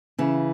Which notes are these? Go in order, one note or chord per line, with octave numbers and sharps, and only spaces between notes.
C#3 E3